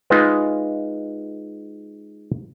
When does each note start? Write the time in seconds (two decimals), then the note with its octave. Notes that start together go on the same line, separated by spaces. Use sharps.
0.10 G#3 D#4 F4 B4